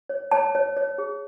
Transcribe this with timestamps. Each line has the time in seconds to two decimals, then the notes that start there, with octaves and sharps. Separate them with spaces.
0.09 C#5
0.31 C#5 A5
0.55 C#5
0.77 C#5
0.98 G#4